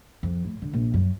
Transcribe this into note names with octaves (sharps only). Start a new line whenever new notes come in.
F2
A2
D3
A#1
F#2